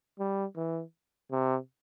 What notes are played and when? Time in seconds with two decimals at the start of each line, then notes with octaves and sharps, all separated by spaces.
0.19 G3
0.56 E3
1.31 C3